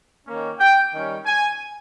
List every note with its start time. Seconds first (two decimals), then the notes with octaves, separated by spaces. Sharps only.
0.27 D#3 A#3 C#4
0.59 G5
0.93 D#3 G3 C#4
1.25 G#5